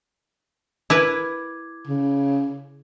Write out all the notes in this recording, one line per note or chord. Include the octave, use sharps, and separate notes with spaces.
E4 A#4 B4 D6 G#6
C#3